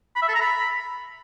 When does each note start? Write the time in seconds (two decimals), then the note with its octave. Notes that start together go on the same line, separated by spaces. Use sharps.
0.16 B5
0.22 E5
0.28 A4
0.34 A#5
0.41 B5